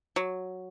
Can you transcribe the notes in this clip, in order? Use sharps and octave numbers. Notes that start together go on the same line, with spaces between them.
F#3